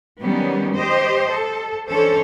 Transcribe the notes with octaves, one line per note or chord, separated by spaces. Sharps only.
D#3 F#3 G3 B3 C#4
G4 C5 D#5
A4
E3 C#4 D4 A4 C5 C#5